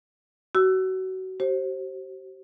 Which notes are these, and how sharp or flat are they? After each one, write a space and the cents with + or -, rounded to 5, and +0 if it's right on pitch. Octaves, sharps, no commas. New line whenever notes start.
F#4 +25 E6 +15
G4 -45 C5 +25